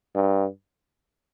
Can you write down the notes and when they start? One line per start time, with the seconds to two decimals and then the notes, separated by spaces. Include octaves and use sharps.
0.15 G2